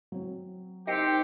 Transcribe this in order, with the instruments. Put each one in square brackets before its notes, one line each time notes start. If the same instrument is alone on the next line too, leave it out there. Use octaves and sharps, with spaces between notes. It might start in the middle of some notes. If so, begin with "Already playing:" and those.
[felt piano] F#3 C4
[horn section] C4 G4 [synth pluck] D#4 C7 C#7 [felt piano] A#4 G5